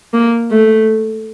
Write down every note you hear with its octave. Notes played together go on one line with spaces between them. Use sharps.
A#3
A3